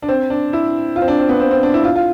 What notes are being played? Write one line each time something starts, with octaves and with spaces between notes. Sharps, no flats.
D4
C4
D4
E4
F4
C4
D4
C4
B3
C4
C4
D4
E4
F4
F4